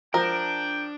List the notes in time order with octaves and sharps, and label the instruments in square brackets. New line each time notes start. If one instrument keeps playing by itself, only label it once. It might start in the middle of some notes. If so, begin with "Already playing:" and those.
[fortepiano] F3 [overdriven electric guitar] D4 [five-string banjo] A#4 [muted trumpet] G5